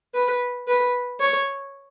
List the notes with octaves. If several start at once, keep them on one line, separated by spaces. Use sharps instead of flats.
B4
B4
C#5